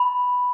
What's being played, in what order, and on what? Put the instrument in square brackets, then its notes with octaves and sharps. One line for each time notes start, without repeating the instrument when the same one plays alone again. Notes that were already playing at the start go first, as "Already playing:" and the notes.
Already playing: [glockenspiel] B5